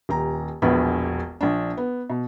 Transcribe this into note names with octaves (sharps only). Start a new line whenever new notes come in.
D#1 G4 A#5
E1 A#1 E2 B4
A#1 D4
B3
B2